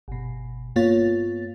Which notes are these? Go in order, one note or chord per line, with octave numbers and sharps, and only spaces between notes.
G1 B2
G2 A#3 B3 F4 C#5 A6